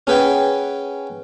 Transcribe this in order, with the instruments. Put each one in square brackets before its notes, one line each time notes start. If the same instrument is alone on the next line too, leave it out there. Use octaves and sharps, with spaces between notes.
[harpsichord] C#4 G#4 B4 F#5 G5